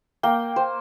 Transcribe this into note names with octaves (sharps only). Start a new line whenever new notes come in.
A#3 G5
C5